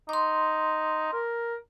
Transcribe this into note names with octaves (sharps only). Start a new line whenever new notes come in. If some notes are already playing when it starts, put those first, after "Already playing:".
D#4 C6 D6
A#4